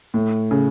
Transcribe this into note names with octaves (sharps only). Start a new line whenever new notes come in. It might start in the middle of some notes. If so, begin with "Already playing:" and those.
A2
C#3